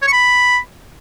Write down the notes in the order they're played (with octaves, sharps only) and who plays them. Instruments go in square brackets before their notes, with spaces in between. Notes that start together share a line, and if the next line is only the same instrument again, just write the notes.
[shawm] C#5
C#6
B5